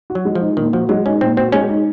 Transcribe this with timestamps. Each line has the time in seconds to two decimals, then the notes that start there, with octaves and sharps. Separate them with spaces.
0.10 F#4
0.15 F#3
0.25 G#3
0.35 F3
0.41 D#4
0.57 A#2 D#3
0.73 F3 F#4
0.89 F#3 G#3
1.06 C#4 D#4
1.21 A#2 C4
1.37 C4 F#4
1.52 G#3 C#4
1.69 D#4